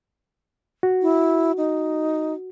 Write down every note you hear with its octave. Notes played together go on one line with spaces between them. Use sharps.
F#4
E4
D#4